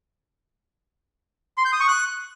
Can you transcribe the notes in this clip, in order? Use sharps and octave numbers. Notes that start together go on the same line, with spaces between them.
C6
G6
D#6
C#6
F#6